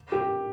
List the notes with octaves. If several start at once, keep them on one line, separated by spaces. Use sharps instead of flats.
G4